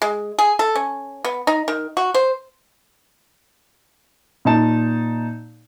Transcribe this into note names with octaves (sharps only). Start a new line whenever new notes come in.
G#3
G#4
A4
C#4
B3
D#4
D#3
F#4
C5
A#2 D#4 A5